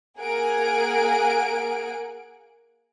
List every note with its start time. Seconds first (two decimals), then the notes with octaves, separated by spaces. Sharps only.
0.18 A#3 G#4 A#4 F#5 G#5 D7